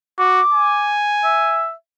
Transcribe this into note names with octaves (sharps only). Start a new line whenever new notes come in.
F#4 D6
G#5
E5